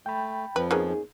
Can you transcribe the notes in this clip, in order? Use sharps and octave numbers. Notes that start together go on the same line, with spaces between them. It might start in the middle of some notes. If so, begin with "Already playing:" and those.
A3 G5 B5
F2 F3 B4
A#3 B3 C#4 D#4 G#4